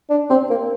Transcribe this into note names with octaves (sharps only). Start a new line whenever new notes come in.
D4
C4
A#3